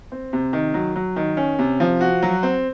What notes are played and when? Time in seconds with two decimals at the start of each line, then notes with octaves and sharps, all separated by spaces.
0.12 C4
0.33 C3
0.53 D#3
0.74 F#3
0.96 F#3
1.16 D#3
1.37 C#4
1.59 C3
1.80 F3
2.01 F#4
2.22 F#3
2.43 C4